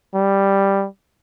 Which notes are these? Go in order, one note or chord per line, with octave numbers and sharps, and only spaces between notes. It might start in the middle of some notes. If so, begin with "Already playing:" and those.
G3